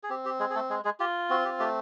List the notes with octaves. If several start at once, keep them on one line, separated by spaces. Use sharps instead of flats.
G#4
C4 G4
G4
G#3 G#4
G#4
A3 A4
G#3 G#4
G#3 G#4
F4 G4
C4 F#4
G4
A3 G4